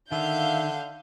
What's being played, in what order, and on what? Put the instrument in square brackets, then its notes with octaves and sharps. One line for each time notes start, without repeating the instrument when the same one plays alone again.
[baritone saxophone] D3 [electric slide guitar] D#3 [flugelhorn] E5 [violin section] F5 G6